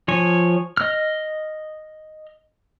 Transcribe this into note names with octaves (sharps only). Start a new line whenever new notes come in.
F3 C#5 G#5
D#5 F6